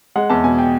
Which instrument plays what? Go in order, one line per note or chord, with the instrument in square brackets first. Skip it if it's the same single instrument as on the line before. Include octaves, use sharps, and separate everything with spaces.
[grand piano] G#3 F#5
E2 A5
B2 G#5
G5